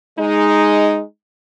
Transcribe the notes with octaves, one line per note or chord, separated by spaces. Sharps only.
G#3 D#4